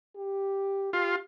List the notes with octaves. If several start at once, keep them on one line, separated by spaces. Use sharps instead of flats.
G4
F4 G4